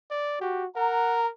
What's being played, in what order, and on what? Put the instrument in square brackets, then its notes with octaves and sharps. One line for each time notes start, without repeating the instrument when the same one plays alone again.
[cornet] D5
[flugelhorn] F#4 [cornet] G4
[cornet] A#4 [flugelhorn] F#5 [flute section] A#5